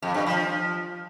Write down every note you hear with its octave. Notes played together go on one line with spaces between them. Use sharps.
F2
G2
F3